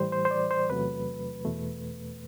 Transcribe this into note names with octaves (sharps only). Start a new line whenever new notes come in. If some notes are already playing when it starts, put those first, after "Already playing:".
Already playing: A2 E3 G3 C5
C5
C5
D5
C5
E2 C3 F#3 A3 B4
E2 B2 A3